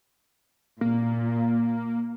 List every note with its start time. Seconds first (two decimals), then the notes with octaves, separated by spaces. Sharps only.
0.81 A#2 A#3